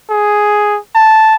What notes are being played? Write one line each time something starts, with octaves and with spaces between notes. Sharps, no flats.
G#4
A5